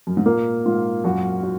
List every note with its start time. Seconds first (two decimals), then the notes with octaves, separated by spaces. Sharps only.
0.07 F#2
0.17 G#2
0.26 A#2 A#3
0.66 G#2 F4
1.04 F#2 F#4
1.43 F#4